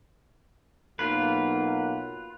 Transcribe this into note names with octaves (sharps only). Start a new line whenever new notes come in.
B1 F#3 A#3 F4 B4